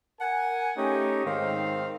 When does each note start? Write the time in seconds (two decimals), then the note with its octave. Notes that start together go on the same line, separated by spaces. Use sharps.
0.20 A#4 F#5 G#5
0.77 A3 C#4 D#4 G4
1.25 G#2 D#3 C4 F5